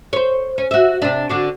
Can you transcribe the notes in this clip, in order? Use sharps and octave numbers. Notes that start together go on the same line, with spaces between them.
C5 C#5
C#4
F#4 E5
C3 D4
D3 D4 F#4